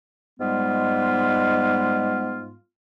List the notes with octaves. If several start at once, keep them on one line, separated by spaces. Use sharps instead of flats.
G#2 G3 G#3 B3 F4